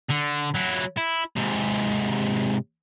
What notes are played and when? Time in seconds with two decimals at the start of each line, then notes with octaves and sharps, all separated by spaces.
0.10 D3
0.55 F#3 E4
0.97 E4
1.37 G#2 C3